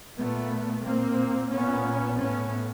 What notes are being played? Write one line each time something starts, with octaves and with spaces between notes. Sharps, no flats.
A#2 A3 B3
A#2 A#3 C4
A#2 B3 C#4
A2 B3 C#4